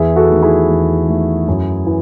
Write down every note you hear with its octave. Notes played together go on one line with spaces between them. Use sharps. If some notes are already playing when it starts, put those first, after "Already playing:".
Already playing: E2 E4 G#4
F#4 A4
D#3 A3
E4 G#4
E2
D#3 A3
F#2
E3